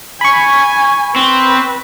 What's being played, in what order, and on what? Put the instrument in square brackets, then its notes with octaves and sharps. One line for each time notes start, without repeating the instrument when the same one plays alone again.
[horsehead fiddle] G#5 [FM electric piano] B5 C#6
[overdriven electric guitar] C4 [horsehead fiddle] B4